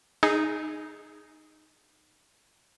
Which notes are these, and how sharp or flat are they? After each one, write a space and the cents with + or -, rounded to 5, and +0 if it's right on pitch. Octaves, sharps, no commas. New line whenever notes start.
D#4 -10 G#4 +0